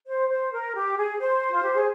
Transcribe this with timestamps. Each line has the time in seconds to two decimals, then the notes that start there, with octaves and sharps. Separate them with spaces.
0.07 C5
0.29 C5
0.52 A#4
0.75 G4
0.98 G#4
1.19 C5
1.50 F4
1.63 G4
1.75 G#4